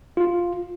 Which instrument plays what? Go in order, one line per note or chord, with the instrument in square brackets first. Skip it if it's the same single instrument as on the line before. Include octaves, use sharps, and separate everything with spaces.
[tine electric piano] F4